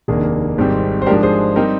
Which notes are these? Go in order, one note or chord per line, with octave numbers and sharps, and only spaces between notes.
F1 D#2 D#3 A#3 D4 G#4
G#1 G#2 G3 C4
C5
G#2 F3 G#3 D4 G4 A#4
G#4 C5
G3 C4 D#4 G4 A#4